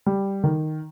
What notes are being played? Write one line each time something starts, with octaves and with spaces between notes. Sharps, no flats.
G3
D#3